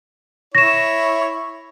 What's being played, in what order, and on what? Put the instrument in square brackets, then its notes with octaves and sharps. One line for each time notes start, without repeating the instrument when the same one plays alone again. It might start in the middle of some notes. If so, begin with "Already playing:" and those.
[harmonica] E4 C#5 [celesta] A#6 E7